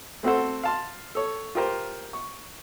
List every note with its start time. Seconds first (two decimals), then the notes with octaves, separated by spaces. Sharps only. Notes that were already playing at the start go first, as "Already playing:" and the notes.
0.23 A3 C4 F#4 A4 C5
0.63 F5 A5 C6
1.15 A4 C#5
1.55 F4 G4 A#4 C5
2.13 C#6